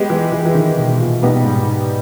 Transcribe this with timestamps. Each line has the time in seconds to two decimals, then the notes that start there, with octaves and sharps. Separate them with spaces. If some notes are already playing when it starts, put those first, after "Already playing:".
Already playing: G#3 B3 G4
0.10 E3
0.32 E3
0.46 E3
0.54 D#3
0.78 B2
0.99 A#2
1.22 B2 G3 B3 D#4 G4
1.44 G#2